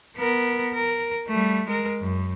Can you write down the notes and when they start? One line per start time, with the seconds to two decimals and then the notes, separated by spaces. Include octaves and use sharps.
0.17 B3 A#4
0.74 A#4
1.28 G3 A3
1.67 G#3 A#4
2.00 F#2